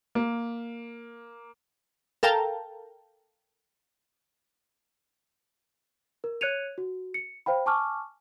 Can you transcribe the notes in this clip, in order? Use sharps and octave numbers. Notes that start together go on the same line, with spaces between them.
A#3
A4 A#4 F5 G5 A5 A#5
A#4
C#5 F#6 G#6 C#7 D#7 F7
F#4
C#7
C5 F5 G5 B5
G#5 A5 C#6 D6 F6